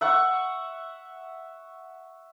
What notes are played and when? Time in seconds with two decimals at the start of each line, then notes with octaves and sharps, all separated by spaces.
0.01 E5 F#5 C#6